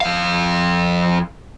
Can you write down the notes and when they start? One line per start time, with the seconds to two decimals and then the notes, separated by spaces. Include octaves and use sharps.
0.01 F2 F5